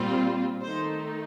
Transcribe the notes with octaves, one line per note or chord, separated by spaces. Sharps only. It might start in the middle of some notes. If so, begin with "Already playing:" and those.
Already playing: A#2 G3 C4 F4
D#3 A3 D#4 C5